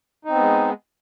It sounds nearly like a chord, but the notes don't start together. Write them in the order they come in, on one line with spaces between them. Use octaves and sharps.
D#4 C4 B3 G#3